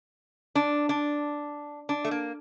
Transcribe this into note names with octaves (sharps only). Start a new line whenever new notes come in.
D4
D4
D4
A3
A#3